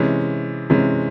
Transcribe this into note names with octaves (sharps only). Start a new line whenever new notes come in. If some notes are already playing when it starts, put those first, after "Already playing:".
Already playing: C3 E3 G#3 C#4
C3 E3 G#3 C#4